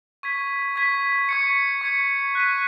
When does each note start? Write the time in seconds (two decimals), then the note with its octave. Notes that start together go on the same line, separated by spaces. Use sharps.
0.23 C#6 G#6 B6
0.76 C#6 G#6 B6
1.29 C#6 G#6 C#7
1.81 C#6 G#6 C#7
2.35 F#6 B6 D#7